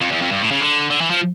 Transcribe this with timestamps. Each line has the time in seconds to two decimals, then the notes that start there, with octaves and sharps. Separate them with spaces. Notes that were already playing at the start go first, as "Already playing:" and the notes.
0.02 F2
0.12 E2
0.22 F2
0.31 G2
0.41 A2
0.51 C#3
0.61 D3
0.90 D3
1.01 E3
1.10 F3